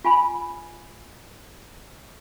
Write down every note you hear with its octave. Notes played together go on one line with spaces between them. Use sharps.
F4 G#5 B5